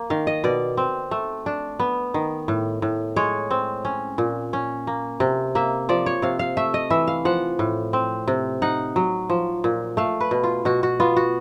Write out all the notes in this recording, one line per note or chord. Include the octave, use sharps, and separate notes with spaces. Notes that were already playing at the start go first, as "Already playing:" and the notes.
Already playing: A#3
D#3 F5
D#5
B2 D5
C4
A3
D4
B3
D#3
A2
A2
G#3 C#5
C4
C#4
A#2
C#4
A#3
C3
A#3 E5
F3 D5
C#5
C3 F5
F5
A3 E5
D#5
E3 E5
F5
F3 F#5
A2
C4
C3
D#4 F#5
F#3
F3
A#2
A3 F5
B4
B2
F4
B2 F#4
F#4
B3 F4
F#4